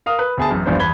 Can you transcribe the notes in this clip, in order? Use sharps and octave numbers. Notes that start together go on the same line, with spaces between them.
A#4 F5 D#6
B4
D2 B3 G#4 G#5 A5
A1 F#2
D#1 A#1 G2 B3 D4 C5
E2 B5 G#6 G7